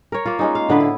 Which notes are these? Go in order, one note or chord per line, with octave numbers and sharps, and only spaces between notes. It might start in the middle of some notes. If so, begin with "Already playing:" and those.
A#4 C#5
A#3 F4
G#3 C#4 D#4
F5
A2 D3 B3 B4
E4